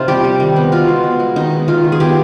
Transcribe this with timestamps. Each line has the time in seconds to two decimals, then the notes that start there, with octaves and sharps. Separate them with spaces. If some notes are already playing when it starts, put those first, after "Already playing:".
Already playing: C3 D#4 F4
0.08 G3 G4
0.24 G3
0.40 D#3
0.56 B3
0.72 B2 F4
0.88 G#3
1.04 B3
1.20 G#3
1.36 D#3 D#4
1.52 B3
1.68 D#3 F4
1.84 D#3
1.92 G#4
2.00 B3 G4